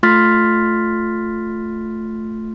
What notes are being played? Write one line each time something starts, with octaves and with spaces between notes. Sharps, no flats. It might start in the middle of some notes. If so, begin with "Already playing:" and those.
A3 F4 C6 F6 A6 B6